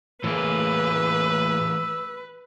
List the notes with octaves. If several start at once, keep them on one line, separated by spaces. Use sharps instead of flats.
A2 E3 A3 A#3 G#4 B4 E6